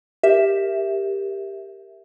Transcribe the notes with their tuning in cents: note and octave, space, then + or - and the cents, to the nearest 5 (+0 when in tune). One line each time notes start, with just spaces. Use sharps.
G4 +10 A#4 +0 E5 +0